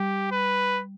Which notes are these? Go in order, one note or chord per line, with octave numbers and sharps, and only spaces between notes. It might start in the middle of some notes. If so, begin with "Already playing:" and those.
Already playing: G3 G4
B4